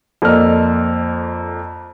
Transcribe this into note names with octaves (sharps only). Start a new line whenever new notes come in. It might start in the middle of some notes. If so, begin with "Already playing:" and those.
F2 A#3 A4 D5 D#5 F6